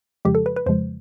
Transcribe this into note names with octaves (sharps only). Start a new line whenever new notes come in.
F2 C#3 F3 G#3 G4
A4
B4
B4
F2 C#3 F3 G#3 C5